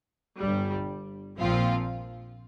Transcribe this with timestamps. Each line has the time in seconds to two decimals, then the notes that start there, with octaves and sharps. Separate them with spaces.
0.39 G1 G2 G3
1.39 A#1 A#2 F3 C4 F4